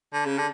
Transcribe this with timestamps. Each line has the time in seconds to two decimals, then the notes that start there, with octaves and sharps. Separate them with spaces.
0.13 D3
0.26 C#3
0.38 D3